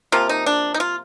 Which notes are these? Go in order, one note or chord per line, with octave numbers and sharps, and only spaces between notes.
C3 F3 A#3 F4
D#4
D4
D#4
F4